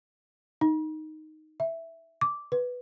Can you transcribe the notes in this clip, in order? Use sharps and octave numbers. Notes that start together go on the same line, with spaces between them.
D#4
E5
D6
B4